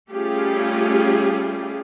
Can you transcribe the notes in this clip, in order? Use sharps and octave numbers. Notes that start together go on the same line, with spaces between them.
G3 A3 C#4 F4 G4 G#4